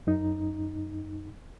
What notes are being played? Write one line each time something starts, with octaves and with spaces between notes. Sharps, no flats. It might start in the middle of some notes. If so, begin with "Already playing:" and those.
F#2 D#4